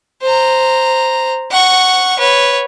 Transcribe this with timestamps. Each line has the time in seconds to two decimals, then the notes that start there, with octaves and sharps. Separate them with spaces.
0.22 C5 A#5
1.51 F#5 C#6
2.19 B4 C#5